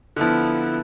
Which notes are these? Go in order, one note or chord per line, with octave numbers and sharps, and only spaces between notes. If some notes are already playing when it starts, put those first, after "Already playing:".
D3 F3 B3 E4